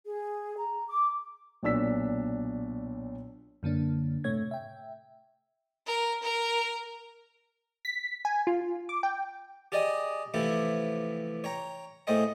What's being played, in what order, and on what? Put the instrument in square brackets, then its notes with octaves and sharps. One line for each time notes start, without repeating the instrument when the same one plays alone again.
[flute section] G#4
A#5
D6
[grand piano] B1 A#2 D4 E6 B6
[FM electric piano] F#2 D3 A#3 D4
A2 C3 A3 C#5 G#6
E5 G5
[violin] A#4
A#4
[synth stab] B6
G#5
F4
D6
G5
[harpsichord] G4 G#4 D5 D#5 G5 G#5
C3 E3 F3 A3 E4 G4
C#5 G5 A#5
A2 A3 G#4 C5 D#5 G5